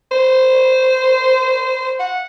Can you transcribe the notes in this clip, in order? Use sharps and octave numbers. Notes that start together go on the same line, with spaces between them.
C5
F#5